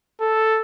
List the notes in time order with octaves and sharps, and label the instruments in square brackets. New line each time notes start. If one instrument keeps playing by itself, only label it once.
[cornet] A4